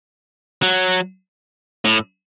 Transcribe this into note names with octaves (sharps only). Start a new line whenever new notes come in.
F#3
A2